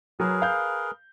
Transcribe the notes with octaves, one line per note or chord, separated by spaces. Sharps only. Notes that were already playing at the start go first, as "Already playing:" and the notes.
F#3 G#4 A#4 B4
F5 G6